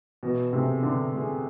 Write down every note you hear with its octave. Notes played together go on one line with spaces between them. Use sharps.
B2 E3
C3 A3 C4 G#4
D3 E3
A3 C4 G#4